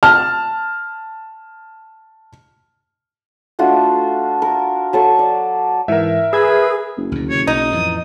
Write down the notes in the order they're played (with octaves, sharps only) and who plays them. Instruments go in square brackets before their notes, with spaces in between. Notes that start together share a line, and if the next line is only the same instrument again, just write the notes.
[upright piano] A5 F6
[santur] A3 D4 F4 F#4
A#4
F#3 A4 C#6
D5
[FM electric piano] G#2 E3 [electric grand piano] A#4 E5
[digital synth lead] G#4 [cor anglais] B4 [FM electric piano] E6 G#6
[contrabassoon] F#1
[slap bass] D2 B2
[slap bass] C3 D#3 [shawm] C#5
[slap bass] B1 [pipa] D#4 [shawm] D#6
[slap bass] F2 A2 E3